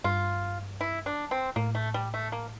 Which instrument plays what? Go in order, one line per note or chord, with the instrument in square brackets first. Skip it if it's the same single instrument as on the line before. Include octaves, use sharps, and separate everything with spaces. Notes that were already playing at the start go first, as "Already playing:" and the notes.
[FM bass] G2 [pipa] F4
[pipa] E4
D4
C4
[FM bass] A2 [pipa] A#3
[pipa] A3
G3
A3
A#3